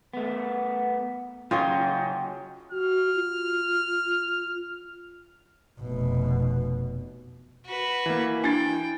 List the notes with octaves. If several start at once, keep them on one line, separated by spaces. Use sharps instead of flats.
A3 B3
C#3 F#3 C#4 F4 C#5 D#5 G5
F#4 F6
F4
F1 B2
F#4 B4
E3 A#3
D4 E4 G5 G#5 A6